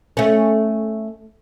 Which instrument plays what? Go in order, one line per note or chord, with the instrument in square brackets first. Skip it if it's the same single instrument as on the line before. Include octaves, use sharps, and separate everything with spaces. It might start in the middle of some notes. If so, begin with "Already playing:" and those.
[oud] A3 C#4